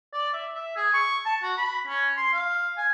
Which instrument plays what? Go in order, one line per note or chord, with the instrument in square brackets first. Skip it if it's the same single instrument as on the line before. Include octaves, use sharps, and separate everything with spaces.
[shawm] D5
E5
E5
G#4
C#6
A5
F#4
B5
C#4
C6
F5
G#5